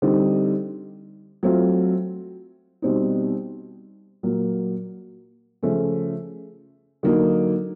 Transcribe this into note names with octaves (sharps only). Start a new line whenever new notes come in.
D3 G3 C4 D#4
F#3 A3 C4 F4
B2 G3 C4 D#4
A#2 F#3 A#3
C#3 F3 A3 C#4
D3 F#3 A#3 D#4